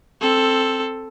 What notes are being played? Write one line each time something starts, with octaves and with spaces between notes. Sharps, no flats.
C4 A4